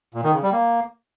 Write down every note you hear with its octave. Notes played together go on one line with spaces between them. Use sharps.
A#2
D#3
C#3
G3
A#3